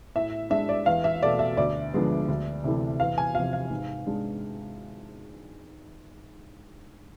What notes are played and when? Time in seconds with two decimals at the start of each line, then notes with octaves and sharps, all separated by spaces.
0.16 A2 E5
0.50 G#3 D4 E5
0.69 D5
0.86 E2 F5
1.04 E5
1.22 B2 A3 D5
1.39 E5
1.57 D2 D5
1.94 D3 F3 G#3 B3
2.28 D2
2.64 C3 E3 A3 E4
3.00 E2 F5
3.18 G#5
3.35 C3 F3 F5
3.53 F5
3.70 G#2
4.07 G#3 D4